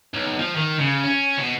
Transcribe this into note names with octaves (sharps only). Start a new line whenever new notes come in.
B1
F3
D#3
C#3
C#4
B2